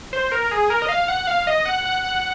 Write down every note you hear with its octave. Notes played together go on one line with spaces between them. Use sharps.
C5
A#4
G#4
A#4
D#5
F5
F#5
F5
D#5
F#5
F#5
F#5